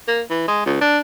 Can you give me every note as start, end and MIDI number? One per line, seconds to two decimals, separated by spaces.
0.08 0.22 58
0.31 0.46 52
0.48 0.61 56
0.66 0.77 37
0.81 0.99 62